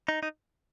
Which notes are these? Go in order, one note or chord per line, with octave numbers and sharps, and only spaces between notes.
D#4
D#4